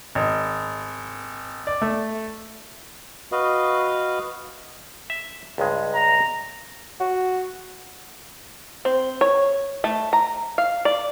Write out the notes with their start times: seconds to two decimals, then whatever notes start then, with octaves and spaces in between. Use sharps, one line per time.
0.15 G#1
1.67 D5
1.82 A3
3.32 F#4 B4 D#5 F5
5.10 E5
5.58 C#2 G2 G#3
5.95 A#5
7.00 F#4
8.85 C4
9.21 C#5
9.84 A3
10.13 A#5
10.58 F5
10.85 D5